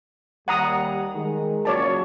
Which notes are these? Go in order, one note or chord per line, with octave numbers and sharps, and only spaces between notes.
D#2 G3 F#5 A#5 D#6
D#3 G#3
A#2 C#3 F#3 C#5 D5 A5